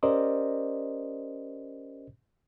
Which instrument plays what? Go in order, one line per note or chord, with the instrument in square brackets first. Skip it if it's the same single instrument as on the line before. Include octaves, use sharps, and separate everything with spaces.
[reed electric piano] C#4 G4 A#4 C5 D5 D#5